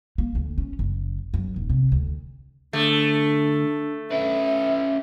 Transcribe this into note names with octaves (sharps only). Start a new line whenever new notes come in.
A#3
D2
C#4
F#1
F#2
D#1
C3
D2
D2 A3 D4
C#4 B4 E5